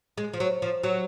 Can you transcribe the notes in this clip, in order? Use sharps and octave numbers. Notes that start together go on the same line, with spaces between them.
G#3
F3
F#3
F3
F#3